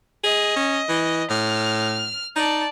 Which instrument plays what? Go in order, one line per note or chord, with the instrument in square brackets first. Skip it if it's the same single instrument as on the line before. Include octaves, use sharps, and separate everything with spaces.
[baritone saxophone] G#4 [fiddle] D#5
[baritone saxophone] C#4
E3
[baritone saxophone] A2 [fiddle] F6
[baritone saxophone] D#4 [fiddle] D5 A5